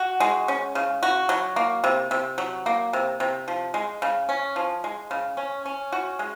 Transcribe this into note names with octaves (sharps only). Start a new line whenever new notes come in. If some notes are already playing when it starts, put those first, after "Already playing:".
Already playing: F#4
G#3
C#4
C#3
F#4
F#3
A#3
C3
C3
F#3
A#3
C3
C3
F3
G#3
C#3
C#4
F3
G#3
C#3
C#4
C#4
F#4
G#3